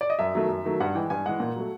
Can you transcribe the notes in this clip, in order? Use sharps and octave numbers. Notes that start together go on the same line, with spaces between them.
D5
D#5
F#2 E5
D#3 F#3 A3
F#2
D#3 F#3 A3
G2 F#5
E3 G#3 G5
G2 G#5
E3 G#3 F#5
A#2
F#3 A3